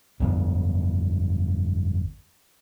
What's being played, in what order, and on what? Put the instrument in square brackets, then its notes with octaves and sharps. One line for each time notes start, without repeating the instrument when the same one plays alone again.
[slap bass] G1 F2 B3